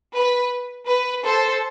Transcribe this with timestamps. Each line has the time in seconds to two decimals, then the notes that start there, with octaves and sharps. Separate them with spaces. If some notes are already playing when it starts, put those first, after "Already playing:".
0.16 B4
0.88 B4
1.25 A4 C5